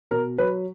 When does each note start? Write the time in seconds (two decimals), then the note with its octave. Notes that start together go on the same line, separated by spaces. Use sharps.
0.11 B2 A#4
0.38 F#3 B4